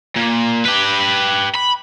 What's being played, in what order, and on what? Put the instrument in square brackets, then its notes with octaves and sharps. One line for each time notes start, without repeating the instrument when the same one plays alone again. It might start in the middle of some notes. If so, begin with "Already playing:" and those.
[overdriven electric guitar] A#2
G4 B4
B5